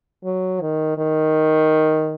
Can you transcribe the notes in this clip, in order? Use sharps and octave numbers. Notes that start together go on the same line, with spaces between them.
F#3
D#3
D#3